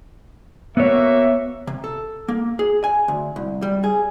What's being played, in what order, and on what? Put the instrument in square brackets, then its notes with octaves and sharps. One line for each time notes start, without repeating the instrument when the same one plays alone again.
[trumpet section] A#3 F#4 E5 [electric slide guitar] B3 C#5
[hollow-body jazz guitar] C3
A4
A#3
G#4
G#5
D2
C2
G3
G#4